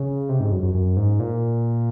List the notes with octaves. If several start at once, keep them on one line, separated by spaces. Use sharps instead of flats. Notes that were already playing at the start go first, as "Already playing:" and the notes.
Already playing: C#3
C3
G#2
F#2
F#2
F#2
G#2
A#2